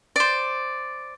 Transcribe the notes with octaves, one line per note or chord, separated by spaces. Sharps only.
C5 D5